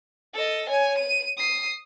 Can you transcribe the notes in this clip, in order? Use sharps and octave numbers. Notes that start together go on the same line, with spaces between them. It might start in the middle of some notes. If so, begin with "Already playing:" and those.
A4 D#5
C#5 G#5
D#7
D#6 C7